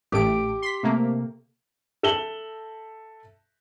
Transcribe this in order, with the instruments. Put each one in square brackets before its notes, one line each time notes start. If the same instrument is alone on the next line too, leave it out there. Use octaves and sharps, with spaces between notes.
[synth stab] A1 A3 D7 [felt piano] G4
[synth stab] C6 B6
C3 A3 A#3
[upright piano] A4 E5 E7 F#7 G7